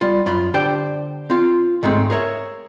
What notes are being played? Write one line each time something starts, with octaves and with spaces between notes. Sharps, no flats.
G3 F4
F#2 F4 B5
D3 D4 G4 C5 G5
C4 F4
C#2 G#2 G#3 A3 C4
G#4 A#4 C#5 E5